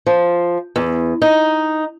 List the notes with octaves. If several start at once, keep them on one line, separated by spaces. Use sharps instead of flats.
F3
E2
D#4